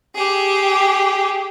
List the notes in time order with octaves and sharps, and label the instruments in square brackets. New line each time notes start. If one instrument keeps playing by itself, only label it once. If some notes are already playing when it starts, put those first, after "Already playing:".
[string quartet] G4 G#4